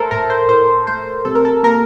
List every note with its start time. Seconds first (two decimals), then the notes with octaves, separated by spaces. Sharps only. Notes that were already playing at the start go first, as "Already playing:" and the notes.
Already playing: A3 A4 A#4 C5
0.11 A2 A#4
0.30 C5
0.49 A2 C5
0.87 A3 C5
1.25 C3 A4
1.35 A#4
1.45 A4
1.63 A#3 A#4